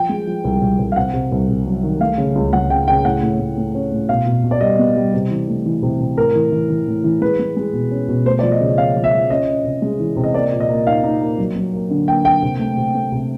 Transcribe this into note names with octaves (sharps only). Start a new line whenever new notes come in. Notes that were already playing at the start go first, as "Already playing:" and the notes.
Already playing: F3 G5
G#3
F3
C2
C2
C2
F5
C3 F#5
C3
C2
C3
F#3
D#3
A3 F5
C#3
C#2
C#2 F#5
C#3 G5
C#3 G5
A2 F#5
A2
A2
A3
C#4
A2
B2 F5
B2
B2
D5
G3 D#5
B3
G3
C3
E3
A3
E3
C3
C3
A2 A#4
E3
E3
E3
A2
E3
G#3 B4
G#3
G#3
B2
C#4
B2
A3 C5
D5
F3
D#5
C#3
C#4 F5
F3
E5
F3
C#4 D#5
C#4
C3
G#3
E3
C3
D#5
A#3 D5
A#2
D#5
A#3
D#4 F5
D#4
A#3
F#3
F#3
A#3
D3
A#3 G5
A#3 G5
C3
A3
C3
A3
C3